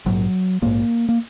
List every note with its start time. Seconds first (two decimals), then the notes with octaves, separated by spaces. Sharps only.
0.06 A#1 G#2 F#3
0.62 A#1 G#2 A#3
1.09 A#3